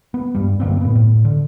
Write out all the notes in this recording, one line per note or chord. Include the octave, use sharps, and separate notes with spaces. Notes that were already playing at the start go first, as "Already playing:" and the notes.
B3
G2 G3
F#2 D3 A#3 C4
A2 B3
A2
D3